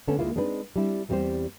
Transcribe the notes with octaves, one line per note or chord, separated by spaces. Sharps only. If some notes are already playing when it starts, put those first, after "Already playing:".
D3 A3 B3 C#4 A4
D2 G#3 A#3 E4 F4
G#3 C4 D4 D#4 A4 B4
G3 C4 D4 E4
E2 G3 C4 F4 G4 C5